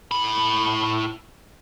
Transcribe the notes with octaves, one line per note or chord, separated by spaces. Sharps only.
A2 B5